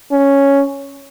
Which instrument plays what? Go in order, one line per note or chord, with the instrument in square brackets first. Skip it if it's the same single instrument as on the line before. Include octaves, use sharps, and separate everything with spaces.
[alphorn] C#4